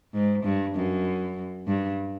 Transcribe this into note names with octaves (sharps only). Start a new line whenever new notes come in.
G#2
G2
F#2
G2